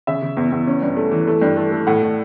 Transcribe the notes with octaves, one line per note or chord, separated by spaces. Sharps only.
C#3 E5
C#3
E2
E2
C#4
G2
A3
E3
A3
G2
A3
A3
A2 F#5
A2